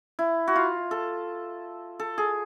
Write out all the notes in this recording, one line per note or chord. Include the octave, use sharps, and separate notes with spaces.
E4
F#4
F4
A4
A4
G#4